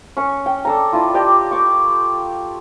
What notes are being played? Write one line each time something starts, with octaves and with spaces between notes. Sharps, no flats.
C#4 C#6
G5
D4 A4 A#5
D4 E4 F4
G4 D5 D#5
C#6 D6